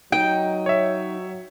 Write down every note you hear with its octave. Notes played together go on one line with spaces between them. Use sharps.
F#3 D#4 G5
C#5 E5